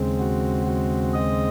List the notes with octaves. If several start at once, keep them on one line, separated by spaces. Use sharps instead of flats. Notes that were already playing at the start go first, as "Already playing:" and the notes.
Already playing: D#2 C#3 G#3 C4
F#4
F#4
D#5